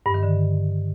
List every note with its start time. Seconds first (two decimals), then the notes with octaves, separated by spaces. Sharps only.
0.06 G2
0.14 D#3
0.23 D3